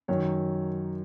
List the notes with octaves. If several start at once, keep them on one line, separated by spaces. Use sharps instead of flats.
F#2 D#3 F#3 C#5